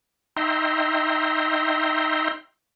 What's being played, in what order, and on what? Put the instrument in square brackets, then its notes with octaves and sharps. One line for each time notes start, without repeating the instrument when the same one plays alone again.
[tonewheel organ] D#4 E5 G5 A#5 C6